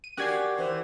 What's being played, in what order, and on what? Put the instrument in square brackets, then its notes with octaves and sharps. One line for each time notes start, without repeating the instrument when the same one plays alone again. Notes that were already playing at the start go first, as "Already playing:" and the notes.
[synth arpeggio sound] D#7
[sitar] F#4 G4 [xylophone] A#4 D5 G#5 [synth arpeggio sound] F#6 G#6 C7
[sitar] E3 [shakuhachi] C5